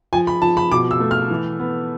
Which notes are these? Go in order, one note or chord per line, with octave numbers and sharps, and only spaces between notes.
F3 G#5
B5
F3 A5
B5
B2 D6
E6
A3
F6
E3
B3